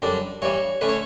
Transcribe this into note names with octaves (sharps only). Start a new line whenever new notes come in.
F#2 D3 G3 D4
G2 E3 G3 C#5
D3 A3 C#4 B4
C#5